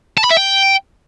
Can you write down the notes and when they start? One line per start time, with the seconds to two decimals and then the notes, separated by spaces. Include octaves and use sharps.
0.18 A5
0.24 B5
0.30 E5
0.37 G5